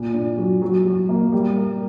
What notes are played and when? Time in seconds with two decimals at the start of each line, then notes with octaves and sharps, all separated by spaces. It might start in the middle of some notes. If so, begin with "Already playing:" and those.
Already playing: A#2
0.14 D4
0.37 F#3
0.62 F#3
0.86 F#3
1.09 A#3
1.32 G3
1.56 A#4